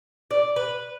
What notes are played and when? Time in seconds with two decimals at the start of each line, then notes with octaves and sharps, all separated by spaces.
0.31 D5
0.56 B4